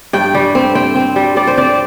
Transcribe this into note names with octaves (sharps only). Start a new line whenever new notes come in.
G2 G5
G3
C4
C4 G5
C4
G3
G3 D5
C5
C4 D5